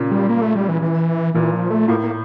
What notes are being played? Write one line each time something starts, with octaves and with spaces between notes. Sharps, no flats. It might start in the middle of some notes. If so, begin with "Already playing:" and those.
Already playing: A#2 C#3
G3
A#3
A3
G3
E3
E3
A#2 E3
F3
A3
A2 A#3
A#3